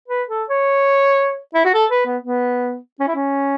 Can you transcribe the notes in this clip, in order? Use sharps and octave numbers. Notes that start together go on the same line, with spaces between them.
B4
A4
C#5
E4
F#4
A4
B4
B3
B3
C#4
E4
C#4